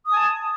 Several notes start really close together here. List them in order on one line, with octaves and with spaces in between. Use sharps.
D#6 G#5 A5